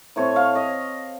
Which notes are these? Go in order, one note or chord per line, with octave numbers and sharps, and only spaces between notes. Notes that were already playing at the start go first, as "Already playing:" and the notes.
A2 A3 C4 C#5
F5
D#5